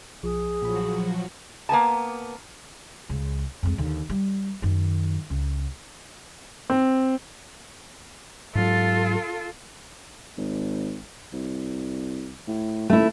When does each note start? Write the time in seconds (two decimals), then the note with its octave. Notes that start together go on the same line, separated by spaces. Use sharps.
0.23 B1 F3 G#4
0.62 A#2 F3 F#3 F#4 B5
1.69 A#3 B3 G#5 A5
3.09 C#2
3.63 F2 G#3
3.78 D#2 D3
4.09 G3
4.62 F#2 D#3
5.30 C#2
6.70 C4
8.55 G#2 F#3 F4 A4
10.37 G#1
11.33 C2
12.48 A2
12.90 D#1 A3 E4